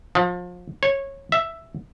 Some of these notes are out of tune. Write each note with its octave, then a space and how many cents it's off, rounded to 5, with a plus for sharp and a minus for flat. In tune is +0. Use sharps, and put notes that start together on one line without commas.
F3 +30
C#5 -15
E5 +5